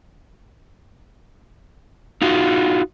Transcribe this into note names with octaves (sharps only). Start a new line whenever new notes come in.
D#4 F4 F#4